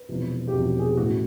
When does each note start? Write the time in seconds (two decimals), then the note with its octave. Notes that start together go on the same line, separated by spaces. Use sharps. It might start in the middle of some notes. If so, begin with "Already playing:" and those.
Already playing: B4
0.08 E1 E2 C3 F3
0.48 G4
0.53 E1 E2 C3 F3 F#4
0.79 G#4
0.88 G4
0.97 A1 A2 E3 F#4